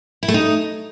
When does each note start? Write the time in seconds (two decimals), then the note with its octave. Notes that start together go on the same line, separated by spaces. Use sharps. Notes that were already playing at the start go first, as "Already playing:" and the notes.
0.23 E4
0.28 A3
0.34 D#4